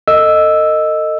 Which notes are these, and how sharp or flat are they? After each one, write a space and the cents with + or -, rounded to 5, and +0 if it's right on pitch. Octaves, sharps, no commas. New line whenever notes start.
A4 +40 D#5 +0 E6 +0